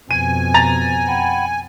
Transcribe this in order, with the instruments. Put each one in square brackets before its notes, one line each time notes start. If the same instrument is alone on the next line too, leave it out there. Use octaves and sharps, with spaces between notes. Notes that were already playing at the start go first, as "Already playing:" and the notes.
[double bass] F2 B2 [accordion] G#5 [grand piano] D#7
[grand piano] A#5 A6 F7
[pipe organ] F#5 G5 B5